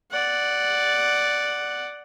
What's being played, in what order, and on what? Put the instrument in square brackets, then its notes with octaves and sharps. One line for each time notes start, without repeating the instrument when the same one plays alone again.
[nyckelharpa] D5 F#5